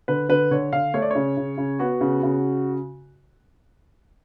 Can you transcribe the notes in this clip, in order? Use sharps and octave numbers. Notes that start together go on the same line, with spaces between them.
D3 B4
D3 B4
D3 C#5
D3 F5
A3 C#5
D5
C#3 C#5
C#3
C#3
B3 F#4
C#3
C#3